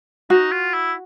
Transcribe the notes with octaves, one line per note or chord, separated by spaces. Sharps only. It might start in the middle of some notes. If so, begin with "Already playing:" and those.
D#4 F#4
F4
E4